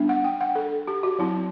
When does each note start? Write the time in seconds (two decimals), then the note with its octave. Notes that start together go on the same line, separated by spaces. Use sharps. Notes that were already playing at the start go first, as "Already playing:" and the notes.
Already playing: G3 B3 D4
0.09 F#5
0.24 G5
0.41 F#5
0.55 A4
0.87 G4
1.03 F#4
1.19 F#3 C4 E4